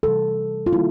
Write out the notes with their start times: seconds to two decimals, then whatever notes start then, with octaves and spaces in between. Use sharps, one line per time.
0.03 C3 E3 G3 A4
0.66 F4
0.73 D#3 G3 A#3 E4